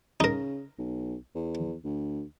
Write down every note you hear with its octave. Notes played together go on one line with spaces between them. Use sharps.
C#3 D#4 A#4
B1
E2
D2